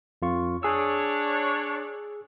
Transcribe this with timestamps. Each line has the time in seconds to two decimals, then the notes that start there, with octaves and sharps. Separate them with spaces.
0.22 F2 F4 C#6
0.63 D4 G#4 C#5 E6